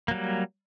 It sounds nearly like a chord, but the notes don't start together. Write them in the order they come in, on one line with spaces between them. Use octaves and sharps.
A#3 F#3 G3